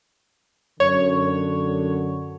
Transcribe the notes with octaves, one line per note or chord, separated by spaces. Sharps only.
F#2 D3 C#5